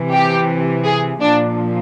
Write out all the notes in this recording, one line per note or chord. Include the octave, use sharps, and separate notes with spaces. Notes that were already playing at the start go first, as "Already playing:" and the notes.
Already playing: C3 E3
G4
G#4
A#2 F3 D4